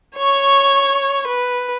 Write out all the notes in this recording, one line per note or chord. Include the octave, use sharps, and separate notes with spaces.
C#5 C#6
B4